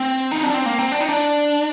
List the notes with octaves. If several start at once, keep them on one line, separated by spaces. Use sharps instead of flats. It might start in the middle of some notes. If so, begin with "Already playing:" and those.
Already playing: C4
D#4
D4
C4
A#3
C4
D4
D#4
D4